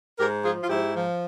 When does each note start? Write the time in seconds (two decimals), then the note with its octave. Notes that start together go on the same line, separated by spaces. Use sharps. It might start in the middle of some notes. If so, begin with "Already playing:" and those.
0.19 G#2 G4 A#4
0.44 F3 F4 G#4
0.63 F4
0.70 G#2 E4 G4
0.96 F3